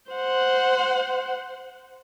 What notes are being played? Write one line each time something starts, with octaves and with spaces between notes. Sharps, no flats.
C5 F#5